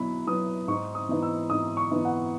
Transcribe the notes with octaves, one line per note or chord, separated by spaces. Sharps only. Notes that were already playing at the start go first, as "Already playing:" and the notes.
Already playing: B2 F#3 E4 B5
F#3 B3 E4 D#6
G#2 C#6
D#6
E3 B3 D#4
E6
G#2 D#6
C#6
E3 B3 D#4
F#5